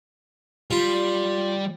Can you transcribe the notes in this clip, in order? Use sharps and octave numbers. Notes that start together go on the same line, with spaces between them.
G3 F4